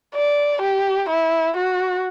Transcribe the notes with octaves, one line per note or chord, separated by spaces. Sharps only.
D5
G4
E4
F#4